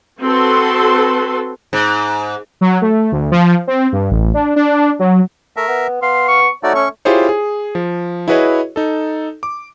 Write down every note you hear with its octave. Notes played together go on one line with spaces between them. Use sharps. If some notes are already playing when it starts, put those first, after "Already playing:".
C4 F#4 A4 B4 C6
G#2
F#3
A3
D2
F3
C4
G2
A1
D4
D4
F#3
A3 A#4 E5
B3
B3 F5 C6
C#6
A3 D#4 F#4 C#5 D5
C#4 C#6
E4 F4 G4 G#4 C5 C#5
G#4
F3
E4 F#4 G#4 B4 C#5 D#5
D#4 A4
D6